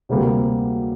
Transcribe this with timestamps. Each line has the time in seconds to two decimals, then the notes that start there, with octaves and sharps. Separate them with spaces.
0.09 D2 C3 G3 A#3